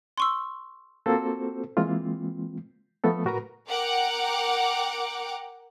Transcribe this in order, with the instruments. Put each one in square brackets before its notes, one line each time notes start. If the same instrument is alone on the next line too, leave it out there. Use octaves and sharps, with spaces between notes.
[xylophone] C6 C#6 E6
[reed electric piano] A#3 C4 F4 F#4 A4 C5
E3 G#3 A#3 C4 F4
F3 A3 B3 A4
A2 F#4 A#4 B4 A#5
[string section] A#4 F#5 G5 D6